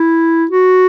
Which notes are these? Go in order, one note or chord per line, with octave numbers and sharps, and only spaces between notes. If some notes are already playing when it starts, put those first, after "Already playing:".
Already playing: E4
F#4